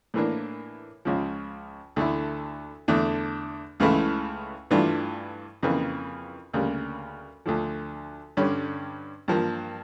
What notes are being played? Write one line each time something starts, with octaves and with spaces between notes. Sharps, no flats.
A2 E3 A#3 D4
C#2 C#3 F3
D2 D3 A3 E4
E2 D3 A3
C#2 C#3 E3 A3 E4
G2 E3 A3 D4 F4
F2 C#3 E3 A#3
D2 C#3 G3 A#3
D2 D3 F3
G2 D3 G3 C#4
G2 F3 A#3